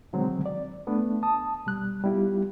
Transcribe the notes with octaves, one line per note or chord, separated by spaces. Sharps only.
B2 D3 D#3 F#3 G#3 C4
D5
A3 B3 D4
A5 D#6
B2 G3 F#6
G3 B3 E4 F4 G4